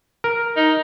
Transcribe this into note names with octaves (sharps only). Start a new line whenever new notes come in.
A#4
D#4